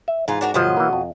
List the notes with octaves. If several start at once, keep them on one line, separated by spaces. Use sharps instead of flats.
E5
G#2 E3 F4
D4 F#4 A#4
G1 B2 F3 F#3 D#5
E3 A#3
F2